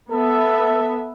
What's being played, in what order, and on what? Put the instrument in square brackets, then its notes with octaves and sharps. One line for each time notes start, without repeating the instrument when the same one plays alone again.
[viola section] B3 E5 [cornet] A4